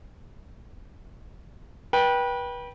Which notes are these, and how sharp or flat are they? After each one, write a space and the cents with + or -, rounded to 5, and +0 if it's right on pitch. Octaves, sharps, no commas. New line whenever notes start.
B4 -30 G5 +0